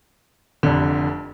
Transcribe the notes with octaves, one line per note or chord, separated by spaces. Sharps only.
F1 F2 D3